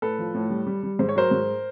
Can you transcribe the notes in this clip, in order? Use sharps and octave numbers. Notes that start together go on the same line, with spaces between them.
A2 A4 B4
F3
A2
G3
G3
G3
G#2 C5
C#5
F#3 A#4 C5
G#2